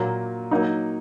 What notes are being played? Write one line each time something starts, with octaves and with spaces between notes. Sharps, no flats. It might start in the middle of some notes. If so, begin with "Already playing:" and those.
Already playing: A#2 F#3 A#3
F#3 A#3 D#4